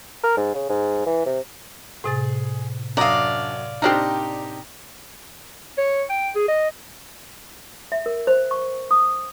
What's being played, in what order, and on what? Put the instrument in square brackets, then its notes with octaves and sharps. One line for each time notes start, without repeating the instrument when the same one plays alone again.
[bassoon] A#4
G#2
C#3
G#2
E3
C3
[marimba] A2 C3 A6 [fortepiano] G#4
[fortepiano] F#2 D#6 [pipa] D4 A#5 [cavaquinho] D5 F5
[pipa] C4 D4 A#4 [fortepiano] D#4 G4
[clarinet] C#5
G5
G#4
D#5
[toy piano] E5
A#4
C5
C#6
D#6